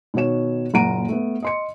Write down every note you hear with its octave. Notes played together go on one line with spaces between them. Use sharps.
B2 D#3 F#4 C#5 E7
F#1 A#2 F#5 A#5 D7 D#7
A3 B3
D#5 C6 C#7